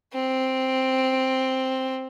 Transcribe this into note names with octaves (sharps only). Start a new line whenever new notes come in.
C4